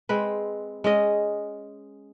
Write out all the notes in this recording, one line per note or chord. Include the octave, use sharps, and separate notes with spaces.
G#3 C4 B4
G#3 C#4 D#5